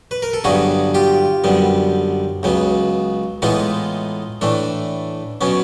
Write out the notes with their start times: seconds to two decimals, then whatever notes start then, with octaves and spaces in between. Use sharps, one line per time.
0.11 B4
0.22 A#4
0.33 A4
0.44 G2 D3 F#3 B3 F#4 G#4
0.94 F4 G4
1.44 F#2 D3 G3 B3
2.43 C#2 C#3 F#3 B3
3.42 A2 E3 G#3 B3 D#4 F4
4.41 A2 E3 A3 D4
5.41 B2 F#3 B3 C#4